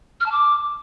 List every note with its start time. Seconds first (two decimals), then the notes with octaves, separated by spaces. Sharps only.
0.20 F6
0.26 A5
0.32 D6